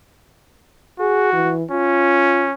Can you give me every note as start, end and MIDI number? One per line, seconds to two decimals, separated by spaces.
1.00 1.54 66
1.00 1.30 68
1.33 1.63 52
1.71 2.54 61
1.71 2.46 65